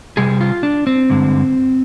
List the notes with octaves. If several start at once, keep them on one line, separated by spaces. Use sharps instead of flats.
C3 G3 G#4
F4
D4
C4
G2 D3 G#3